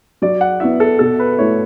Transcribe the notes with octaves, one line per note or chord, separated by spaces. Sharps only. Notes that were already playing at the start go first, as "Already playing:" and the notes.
F#3 D5
F#5
B3 E4 E5
A4
B2 A4
B4
A3 E4 C#5